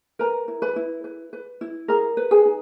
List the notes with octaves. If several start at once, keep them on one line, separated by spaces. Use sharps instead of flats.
A#4 B4 A#5
E4
B4 B5
E4
B4
B4
E4
G#4 A#4 A#5
B4
G#4 G#5
D#4